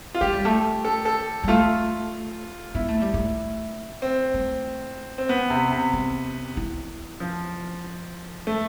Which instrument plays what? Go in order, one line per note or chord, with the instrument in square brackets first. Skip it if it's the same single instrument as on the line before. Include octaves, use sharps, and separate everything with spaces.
[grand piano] F4
[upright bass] A3 [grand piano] G4
[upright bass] G3
A3
[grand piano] A4
A4
[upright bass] G3
[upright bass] A3 [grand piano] F4
[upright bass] B3 [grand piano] E4
[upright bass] A3
G3
A3
[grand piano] C4
[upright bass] A3
[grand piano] C4
B3
C3
C3
[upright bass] C4
E4
[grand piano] F3
A3